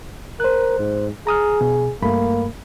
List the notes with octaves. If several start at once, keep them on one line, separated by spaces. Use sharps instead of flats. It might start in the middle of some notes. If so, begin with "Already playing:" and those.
A#4 C5 F#6
G#2
G#4 A#5 D#6 F6
B2
G2 A3 A#3 B5